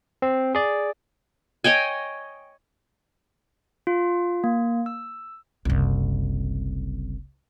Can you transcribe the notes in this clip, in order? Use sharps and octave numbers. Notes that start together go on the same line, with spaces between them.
C4
G#4 D5
C#5 D#5 G5 G#5
F4
A#3
E6
F#1 C2